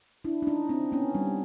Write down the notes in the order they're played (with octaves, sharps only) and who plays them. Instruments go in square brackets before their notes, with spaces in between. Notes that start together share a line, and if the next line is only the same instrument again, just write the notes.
[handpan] D4 E4
D4
C#4 D#4
C4 D4
B3 C#4
G3